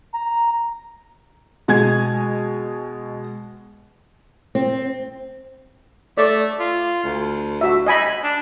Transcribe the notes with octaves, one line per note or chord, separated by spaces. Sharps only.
A#5
B2 G#3 G#5 G#6
C4
A3 D5
F4
D2
F#4 E5
D#5 G#5 B5
D4